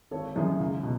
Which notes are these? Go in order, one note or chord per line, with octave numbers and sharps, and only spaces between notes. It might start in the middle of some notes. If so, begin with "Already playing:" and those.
G#1 A4 C#5
F#2 D#3 E4 G#4
C#2
B2